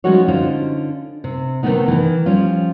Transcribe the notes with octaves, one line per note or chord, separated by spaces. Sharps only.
F3 G#3 C#4 D#4 F#4 C#5
D3 C#4 D#4 F4 C5
C3
C3 D#3 G3 A3 B3 D#4
D#3 E3
F3 G3 C#4 F4